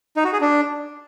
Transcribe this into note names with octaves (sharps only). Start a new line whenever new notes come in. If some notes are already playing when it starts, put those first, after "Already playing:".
D#4
F#4
G#4
D4